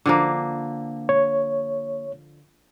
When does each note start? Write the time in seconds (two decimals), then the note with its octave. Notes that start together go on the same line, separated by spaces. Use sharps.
0.06 D3 F3 A#3
1.09 C#5